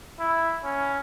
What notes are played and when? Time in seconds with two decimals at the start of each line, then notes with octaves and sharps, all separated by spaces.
0.19 E4
0.64 C#4